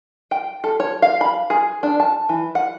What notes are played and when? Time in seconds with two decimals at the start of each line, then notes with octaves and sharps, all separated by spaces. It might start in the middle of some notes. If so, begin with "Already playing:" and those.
0.31 G5
0.64 A4
0.80 C#5
1.02 F5
1.21 B5
1.50 G#4
1.83 D4
2.00 A5
2.29 E3
2.55 F#5